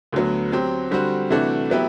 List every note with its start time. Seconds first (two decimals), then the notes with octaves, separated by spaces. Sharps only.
0.13 D2 D3 F#3 B3
0.52 F#3 C4 G4
0.91 D3 G3 C4 F#4
1.30 C3 E3 A3 D4 F#4
1.70 F#3 B3 E4 G4